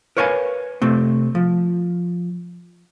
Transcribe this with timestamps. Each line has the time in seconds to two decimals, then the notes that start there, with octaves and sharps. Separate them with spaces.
0.17 A#4 B4 C#5 F5 G5 G#5
0.82 C3 A3 C4
1.35 F3